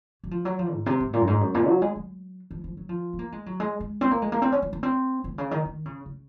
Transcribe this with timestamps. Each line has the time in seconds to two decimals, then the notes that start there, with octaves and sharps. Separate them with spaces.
0.24 F#3
0.31 F3
0.45 F#3
0.59 F3
0.73 G#2
0.86 C3
1.00 G#2
1.13 A#2
1.21 F#2
1.27 G#2
1.41 F#2
1.55 A#2
1.68 F#3
1.82 G#3
1.96 F#3
2.51 F3
2.64 F3
2.77 F#3
2.89 F3
3.13 C4
3.19 A#3
3.32 G#3
3.46 F#3
3.60 G#3
3.80 G#3
4.01 C4
4.11 A#3
4.22 G#3
4.32 A#3
4.42 C4
4.52 C#4
4.62 C4
4.73 A#3
4.83 C4
5.24 C4
5.33 C3
5.38 C#3
5.51 D#3
5.65 D#3
5.85 C#3
6.06 C#3